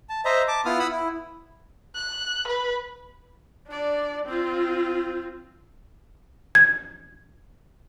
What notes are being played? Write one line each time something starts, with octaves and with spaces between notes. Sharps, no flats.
A5
C5 D#5 E5 A#5
A5 D6
B3 E4 F4 D#6 F6
F#5 B5 D#6 E6
E4
F#6
B4
D4 D5
C4 F4
G#6